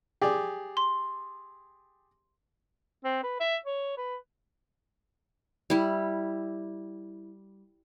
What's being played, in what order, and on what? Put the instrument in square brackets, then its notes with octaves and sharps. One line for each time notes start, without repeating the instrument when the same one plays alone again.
[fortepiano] G4 G#4 D5
[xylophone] C6
[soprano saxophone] C4
B4
E5
C#5
B4
[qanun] G3 E4